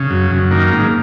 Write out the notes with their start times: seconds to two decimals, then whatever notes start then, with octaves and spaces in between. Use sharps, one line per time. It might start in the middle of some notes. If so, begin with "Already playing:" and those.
Already playing: C#3
0.10 F#2
0.31 F#2
0.51 D#3 A#3
0.72 G#2